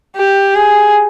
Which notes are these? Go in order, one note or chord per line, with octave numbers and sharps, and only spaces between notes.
G4
G#4